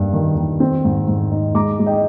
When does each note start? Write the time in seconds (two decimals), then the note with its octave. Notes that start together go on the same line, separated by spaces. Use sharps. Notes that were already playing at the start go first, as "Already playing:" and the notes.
Already playing: G2 A#3
0.13 D#3
0.37 D#3
0.60 C4
0.84 G#2
1.08 G#2
1.31 D#4
1.54 G#3 A#5 D6
1.79 G#3
1.86 D#5 G5